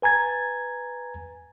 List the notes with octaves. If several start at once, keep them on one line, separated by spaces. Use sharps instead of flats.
B4 G#5 A#5 G#6 A6